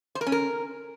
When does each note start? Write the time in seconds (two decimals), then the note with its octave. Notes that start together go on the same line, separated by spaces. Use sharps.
0.15 C5
0.21 A#4
0.27 C#4
0.32 A#4